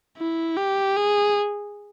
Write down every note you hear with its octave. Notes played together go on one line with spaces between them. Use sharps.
E4
G4
G#4